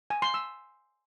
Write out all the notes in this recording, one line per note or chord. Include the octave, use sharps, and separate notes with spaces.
G#5
C6
E6